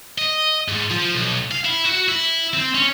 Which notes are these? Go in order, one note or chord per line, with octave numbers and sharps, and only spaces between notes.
D#5
G#2
F3
B1
F5
E4
F#4
E4
C4
C#4